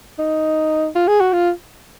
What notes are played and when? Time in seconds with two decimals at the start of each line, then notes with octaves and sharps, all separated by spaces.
0.19 D#4
0.95 F4
1.08 G#4
1.20 F#4
1.33 F4